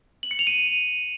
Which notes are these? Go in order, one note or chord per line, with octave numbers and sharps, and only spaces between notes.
F#7
C#7
F7
D#7